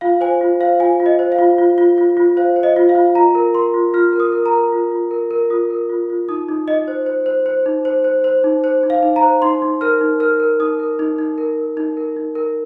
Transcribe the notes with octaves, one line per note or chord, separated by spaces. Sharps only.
F4 F5
C5 G#5
F4
C5 F5
F4 G#5
F4
D#5
C5
F5
F4
F4
F4
F4
F4
C5 F5
C5
D#5
F4
F5
F4
F4 A#5
A#4
A#4 C6
F4
F4 F6
A#4
D#6
A#4
A#5
A#4
F4
F4
A#4
A#4
F4 D#6
A#4
F4
F4
D#4 D#6
D#4
D#4 D#5
C5
C5
C5
C5
D#4
C5
C5
C5
D#4
C5
D#4
F5
D#4
A#5
C5
D#4 C6
D#4
A#4 F6
D#4
A#4 F6
A#4
D#4 D#6
A#4
D#4
D#4
A#4
A#4
D#4
A#4
D#4
A#4